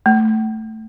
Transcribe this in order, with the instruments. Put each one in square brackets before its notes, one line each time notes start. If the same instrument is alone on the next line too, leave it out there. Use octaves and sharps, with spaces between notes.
[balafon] A3